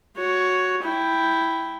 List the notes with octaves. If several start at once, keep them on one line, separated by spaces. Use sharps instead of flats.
F#4 C#5
E4 G5